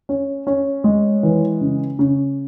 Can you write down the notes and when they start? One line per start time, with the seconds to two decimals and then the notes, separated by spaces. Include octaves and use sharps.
0.09 C#4
0.47 C#4
0.84 G#3
1.23 E3
1.61 C#3
1.99 C#3